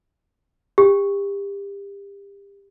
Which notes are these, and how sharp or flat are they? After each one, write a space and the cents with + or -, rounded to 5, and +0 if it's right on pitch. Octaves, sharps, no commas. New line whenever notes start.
G4 +30